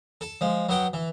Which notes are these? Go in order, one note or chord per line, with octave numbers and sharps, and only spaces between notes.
A4 A5
F3 G#3
F#3 B3 F#5 G5
E3